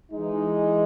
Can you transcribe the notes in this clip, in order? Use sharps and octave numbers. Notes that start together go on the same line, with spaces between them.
E3 G#3 D#4